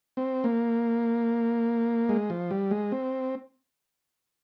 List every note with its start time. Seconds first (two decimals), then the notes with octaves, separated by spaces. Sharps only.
0.17 C4
0.44 A#3
2.09 G#3
2.30 F3
2.51 G3
2.71 G#3
2.92 C4